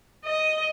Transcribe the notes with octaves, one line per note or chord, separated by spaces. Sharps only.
D#5